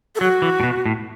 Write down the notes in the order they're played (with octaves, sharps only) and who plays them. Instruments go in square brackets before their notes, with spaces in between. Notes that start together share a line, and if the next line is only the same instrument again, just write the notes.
[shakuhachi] A4
[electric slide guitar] F#3 [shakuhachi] F#4
[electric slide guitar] E3
A2
B2
A2